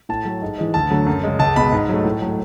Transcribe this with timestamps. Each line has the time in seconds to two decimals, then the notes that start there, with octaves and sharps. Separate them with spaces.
0.09 A2 A5
0.25 F#3 A3
0.42 G#2
0.58 E3 G#3
0.74 D2 A5
0.90 D3 F#3 A3
1.07 F#2
1.24 C#3 G#3
1.39 C#2 A5
1.56 B2 G#3 B5
1.73 G#2
1.89 F#3 A3
2.05 A2
2.21 F#3
2.26 A3